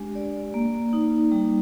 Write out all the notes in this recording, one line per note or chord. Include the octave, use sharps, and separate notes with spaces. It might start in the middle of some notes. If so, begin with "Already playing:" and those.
Already playing: G#3 D4 G4
D5
A#3
D#4
G3